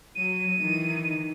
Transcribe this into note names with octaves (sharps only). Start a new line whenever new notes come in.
F#3 D#7
D#3 E3